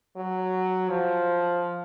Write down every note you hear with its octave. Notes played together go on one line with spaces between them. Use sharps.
F#3
F3